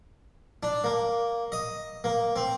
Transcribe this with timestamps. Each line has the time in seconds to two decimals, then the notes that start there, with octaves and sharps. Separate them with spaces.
0.63 D4
0.84 A#3
1.52 D#5
2.04 A#3
2.36 C4